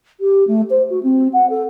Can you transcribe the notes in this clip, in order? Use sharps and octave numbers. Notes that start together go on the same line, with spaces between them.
G4
A3
C5
F#4
C4
F#5
A4